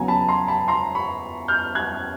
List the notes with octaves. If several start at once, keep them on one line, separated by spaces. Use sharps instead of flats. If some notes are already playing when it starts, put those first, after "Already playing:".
Already playing: E2 C#3 F#3 B3 G#5 A#5
A5 B5
A#5 C6
A5 B5
A#5 C6
B5 C#6
F6 G6
F#6 G#6